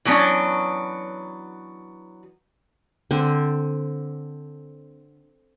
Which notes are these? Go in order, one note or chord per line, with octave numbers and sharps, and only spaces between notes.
E3 F#3 B3 C#4 D4
D3 C4